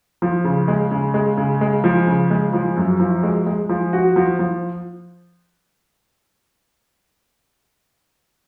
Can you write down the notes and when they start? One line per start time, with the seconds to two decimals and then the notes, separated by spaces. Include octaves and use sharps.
0.22 F3
0.45 C#3
0.68 G#3
0.91 C#3
1.14 G#3
1.37 C#3
1.61 G#3
1.84 F3
2.07 C#3
2.30 G#3
2.53 F3
2.77 F#2
3.00 F3
3.23 G#3
3.46 G#3
3.69 F3
3.93 F#4
4.16 F3
4.39 F3